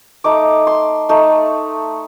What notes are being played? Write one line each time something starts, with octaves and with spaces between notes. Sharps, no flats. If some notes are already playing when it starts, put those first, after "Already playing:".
A3 D#4 D6
C6
A3 D#4